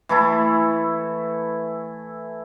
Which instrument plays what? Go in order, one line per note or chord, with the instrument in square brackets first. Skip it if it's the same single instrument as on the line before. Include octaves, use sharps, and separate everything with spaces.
[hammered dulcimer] E3 A3 E4 A4